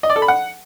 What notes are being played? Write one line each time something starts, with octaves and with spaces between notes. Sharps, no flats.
D#5
D5
A4
B5
F#5